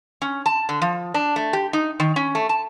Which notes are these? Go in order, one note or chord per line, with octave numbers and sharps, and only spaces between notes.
C#4
A5
D3
F3
D4
A3
G4
D#4
D#3
C#4
A3
A5